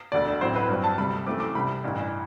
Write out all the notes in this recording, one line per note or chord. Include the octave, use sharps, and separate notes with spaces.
E1 D2 D3 D5
A1 A2 F#3 C4 C5
B4
G2 F#3 C4
A5
D2 C3 G3 B5
F#2 E3 A3 C4 D6
D6
C2 C3 G3 B5
A1 G2 E3